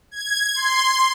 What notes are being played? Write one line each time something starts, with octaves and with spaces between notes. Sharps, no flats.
G#6
C6